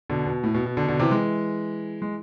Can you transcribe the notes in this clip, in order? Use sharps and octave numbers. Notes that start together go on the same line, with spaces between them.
B2 D3
B2
A2
B2
B2
B2 D3
B2 D3
C3 E3
E3 G#3
G#3